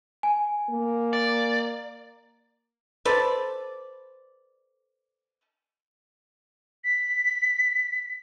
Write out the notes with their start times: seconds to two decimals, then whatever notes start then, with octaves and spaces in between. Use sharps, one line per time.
0.23 G#5
0.70 A#3
1.13 D5
3.05 A4 B4 C5 D5
6.84 B6